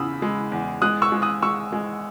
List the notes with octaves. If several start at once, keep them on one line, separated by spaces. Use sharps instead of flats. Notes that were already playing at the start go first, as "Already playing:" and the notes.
Already playing: E2 C#3 B5 D#6 E6
G#3
E2
G#3 D#6 F#6
C#6 E6
G#3
D#6 F#6
G#3 C#6 E6
G#3